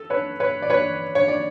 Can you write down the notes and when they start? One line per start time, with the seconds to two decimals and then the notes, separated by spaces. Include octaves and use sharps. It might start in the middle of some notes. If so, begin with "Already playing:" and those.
Already playing: A4
0.10 B4 C#5
0.40 B4 C#5
0.62 D5
0.70 B4 C#5
1.15 C#5
1.28 D5